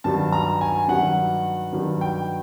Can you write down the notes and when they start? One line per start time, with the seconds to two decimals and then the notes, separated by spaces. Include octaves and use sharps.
0.04 G2 D#3 F#3 A5
0.32 A#5
0.61 G#5
0.88 G2 D#3 F#3 F#5
1.73 G2 D#3 F#3
2.01 G5